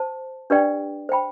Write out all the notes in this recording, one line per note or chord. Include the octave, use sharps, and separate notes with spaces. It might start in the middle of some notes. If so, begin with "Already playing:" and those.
Already playing: C5 A5
D4 G4 B4 D5 G5
C5 G5 B5